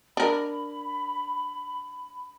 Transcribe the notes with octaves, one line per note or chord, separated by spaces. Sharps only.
D4 A#4 B5